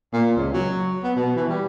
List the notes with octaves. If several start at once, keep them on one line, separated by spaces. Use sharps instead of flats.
A#2
C#2
F#3
B3
B2
E3
G3